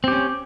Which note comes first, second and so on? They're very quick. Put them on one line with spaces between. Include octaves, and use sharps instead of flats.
C4 G4 C#4